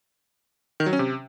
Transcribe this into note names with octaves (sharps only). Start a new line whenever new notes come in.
D#3
F#3
C#4
C3